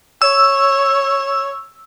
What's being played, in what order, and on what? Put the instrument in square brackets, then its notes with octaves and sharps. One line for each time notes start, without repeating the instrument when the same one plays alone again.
[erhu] C#5 [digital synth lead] E6